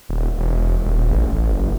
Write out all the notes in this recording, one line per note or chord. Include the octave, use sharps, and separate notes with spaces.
D#1
E1
D#1
A1
A1
F#1